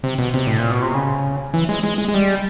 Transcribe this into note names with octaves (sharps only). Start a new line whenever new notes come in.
C3
B2
C3
A2
A#2
B2
C3
C#3
E3
G#3
G#3
G#3
G#3
G3